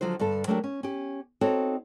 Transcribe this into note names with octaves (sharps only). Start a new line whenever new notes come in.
D3 F3 F#3 F4 C5
G2 D3 A4 A5
F#3 A3 A#3 D4 F#4 G4
C#4
C#4 G4
C4 D#4 F#4 A4 C#5 F5